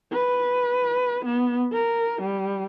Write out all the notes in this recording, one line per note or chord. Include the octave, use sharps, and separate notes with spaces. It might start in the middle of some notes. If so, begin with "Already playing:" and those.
B4
B3
A#4
G3